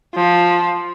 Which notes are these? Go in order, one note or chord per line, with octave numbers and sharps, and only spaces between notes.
F3